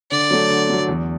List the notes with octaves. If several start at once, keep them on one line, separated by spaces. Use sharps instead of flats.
D3 D5
F#3 A3
D3
F#3 A3
E2